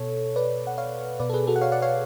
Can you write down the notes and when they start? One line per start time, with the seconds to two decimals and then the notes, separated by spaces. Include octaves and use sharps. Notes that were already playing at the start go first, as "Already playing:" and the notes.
Already playing: B2 A4 C#5
0.36 B4 D5
0.67 F#5
0.78 C#5 F5
1.19 B2 B4 D5
1.29 A4
1.33 G#4 B4
1.47 F#4 A4
1.56 F#5
1.61 C#5 F5
1.72 D5 F#5
1.82 C#5 F5